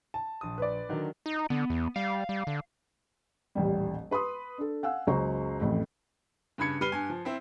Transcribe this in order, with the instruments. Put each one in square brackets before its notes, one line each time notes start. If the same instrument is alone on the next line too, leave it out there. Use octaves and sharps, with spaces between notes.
[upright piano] A5
[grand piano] A#1 D#6
[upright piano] B4 D5
[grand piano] D3 D#3 F#3
[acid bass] D#4
[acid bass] D3 [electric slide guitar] B3
[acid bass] E2
[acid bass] G3 [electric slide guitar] F5
[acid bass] G3
D3
[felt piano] D#1 A1 G3
B4 B5 C6 D#6
D4 A4
F5 F#5 G#5 E6
F#1 C#2 F#3 C5 A#5 C#6
A1 F2 A2
[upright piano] G2 C#3 B5 G#6 C#7
G3 B4 F6 C7 D#7 G7
G2 G#5
F3
C4 E4